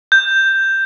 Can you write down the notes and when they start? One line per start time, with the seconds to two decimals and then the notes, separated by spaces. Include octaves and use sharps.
0.12 G6